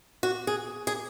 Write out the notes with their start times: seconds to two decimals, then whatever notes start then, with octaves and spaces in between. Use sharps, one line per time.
0.23 F#4
0.47 G#4
0.87 G#4